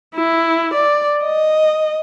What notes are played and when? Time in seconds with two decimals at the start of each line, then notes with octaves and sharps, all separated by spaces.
0.15 E4
0.74 D5
1.24 D#5